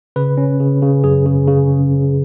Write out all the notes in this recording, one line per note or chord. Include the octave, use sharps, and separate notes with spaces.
C#3 B4
C#4
C#3
C#3
F#2 G#4
C#3
C#3